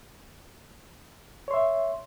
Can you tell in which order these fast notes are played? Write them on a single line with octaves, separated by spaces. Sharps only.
C#5 C6 E5